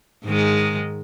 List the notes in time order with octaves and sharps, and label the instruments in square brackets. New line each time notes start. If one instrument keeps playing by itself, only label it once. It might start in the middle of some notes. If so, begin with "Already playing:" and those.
[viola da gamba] G#2 D#3 G#3